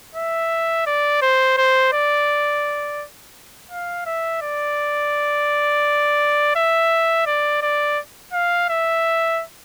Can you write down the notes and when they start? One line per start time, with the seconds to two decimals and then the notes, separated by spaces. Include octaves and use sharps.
0.15 E5
0.86 D5
1.22 C5
1.57 C5
1.93 D5
3.71 F5
4.06 E5
4.41 D5
6.56 E5
7.26 D5
7.62 D5
8.33 F5
8.69 E5